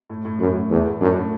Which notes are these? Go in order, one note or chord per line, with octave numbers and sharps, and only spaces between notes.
A2
A2
F#2 A2
A2
E2 A3
A2
F#2 D4
A2